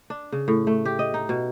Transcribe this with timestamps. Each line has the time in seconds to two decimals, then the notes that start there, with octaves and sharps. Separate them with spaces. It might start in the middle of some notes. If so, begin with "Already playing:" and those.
0.10 D4
0.32 C#3
0.48 A2
0.67 A3
0.85 G4
0.99 D#5
1.14 D#4
1.29 B2